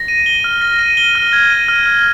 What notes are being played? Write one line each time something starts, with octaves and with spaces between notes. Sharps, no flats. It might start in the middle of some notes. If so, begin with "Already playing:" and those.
Already playing: A#6
D#7
G7
F6
A#6
D#7
G7
F6
G#6
D#7
F6
F6